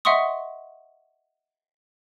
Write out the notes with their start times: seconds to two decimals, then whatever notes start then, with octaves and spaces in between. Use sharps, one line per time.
0.05 D#5 E5 F#5 C6 C#6 D#6